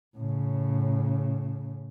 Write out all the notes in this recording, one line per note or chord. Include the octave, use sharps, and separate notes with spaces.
A2 C#3